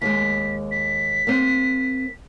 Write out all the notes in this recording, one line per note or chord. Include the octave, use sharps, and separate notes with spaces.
D#2 G#3 B6
B6
A#3 C4